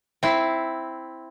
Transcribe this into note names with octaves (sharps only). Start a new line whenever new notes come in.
C4 E4